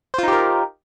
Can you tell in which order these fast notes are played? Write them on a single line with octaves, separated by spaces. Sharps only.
C5 F4 D#4 G4 A#4